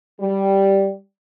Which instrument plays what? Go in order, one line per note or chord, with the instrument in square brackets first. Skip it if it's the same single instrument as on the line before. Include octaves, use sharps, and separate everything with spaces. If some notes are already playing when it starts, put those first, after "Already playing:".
[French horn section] G3